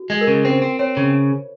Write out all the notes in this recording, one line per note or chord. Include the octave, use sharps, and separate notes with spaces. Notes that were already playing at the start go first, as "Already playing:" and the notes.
Already playing: F#4
G#3
A#4
C#3
C4 C5
C4
C4 C#5
C#3